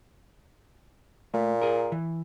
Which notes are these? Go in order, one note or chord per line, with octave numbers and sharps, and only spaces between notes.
A#2 A3
G#4 A#4
E3